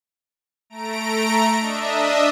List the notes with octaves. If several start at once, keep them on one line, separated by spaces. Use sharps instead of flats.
A3 A#5 D7
D4 D#5 E5